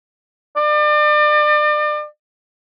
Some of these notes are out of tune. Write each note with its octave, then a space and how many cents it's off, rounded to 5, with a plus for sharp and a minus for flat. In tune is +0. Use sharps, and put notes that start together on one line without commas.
D5 +35